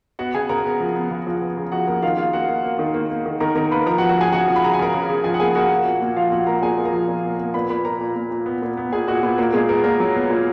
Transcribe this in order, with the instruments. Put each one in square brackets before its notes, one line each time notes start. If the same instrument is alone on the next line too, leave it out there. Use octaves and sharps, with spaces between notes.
[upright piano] B3 F#4 F#5
C#3 G#4 G#5
C#3 A#4 A#5
B3
F3
B3
C#3
F3
B3
C#3
F3 F#4 F#5
C#3 A#3 A#4
D#3 F4 F5
A#3 F4 F5
A#3 F#4 F#5
A#3
A#3
D#3
A#3
A#3
D#3
D#3 A#4 A#5
D#3 A#4 A#5
A#3 B4 B5
F3 A#4 A#5
F#4 F#5
F3
F#4 F#5
C#3 G#4 G#5
C#3 F#4 F#5
F3
B5
C#3 A#5
G#5
C#3 A#4 A#5
C#3
C#3
F3 G#4 G#5
F#5
A#3 G#4 G#5
A#3 F#4 F#5
A#3
A#2
A#2
F3 F4 F5
A#2 F#4 F#5
A#3 A#4 A#5
A#2 G#4 G#5
A#2
A#4 A#5
F3
A#2
A#3
A#3
A#2 B4 B5
A#2 B4 B5
A#2 A#4 A#5
A#2
A#2
A#2
B3
A#2
B3
A#2 G#4 G#5
A#2 F#4 F#5
A#2 B3 B4
A#2 A#3 A#4
A#2 G#3 G#4
A#3 B3 A#4
A#2 A#3 A#4
F#3
B3
A#2